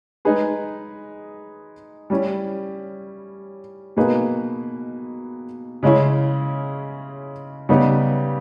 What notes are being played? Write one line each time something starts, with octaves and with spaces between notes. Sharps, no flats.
G#3 D#4 G#4 B4
G3 C#4 E4
B2 A#3 D#4 G#4 B4
C#3 G#3 C#4 E4
C#3 G3 B3 D#4 G4